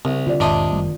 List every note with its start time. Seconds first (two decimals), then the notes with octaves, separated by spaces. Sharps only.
0.05 C2 C#3 C4
0.27 D3 F4 D5
0.40 E1 G#2 C3 D#3 D4 D#5
0.71 F#1 G3 A3